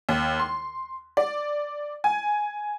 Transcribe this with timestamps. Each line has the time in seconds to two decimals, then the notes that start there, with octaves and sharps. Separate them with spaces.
0.09 D#2
0.39 C6
1.17 D5
2.04 G#5